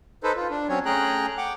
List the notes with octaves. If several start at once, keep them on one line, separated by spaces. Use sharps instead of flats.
D#4 A4 B4 C5
F4
D4
F#3 C4 C#4 C#5
A3 C#4 G#4 G5 A#5 F#6
F#5 G5 D6